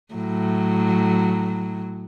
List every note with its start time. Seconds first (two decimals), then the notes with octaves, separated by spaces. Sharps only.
0.14 A2 F#3